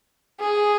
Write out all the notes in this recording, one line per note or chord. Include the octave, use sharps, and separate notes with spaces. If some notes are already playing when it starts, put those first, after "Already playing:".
G#4